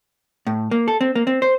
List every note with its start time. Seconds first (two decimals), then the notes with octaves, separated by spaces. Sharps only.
0.47 A2
0.71 A#3
0.88 A4
1.01 C4
1.15 A#3
1.27 C4
1.42 C5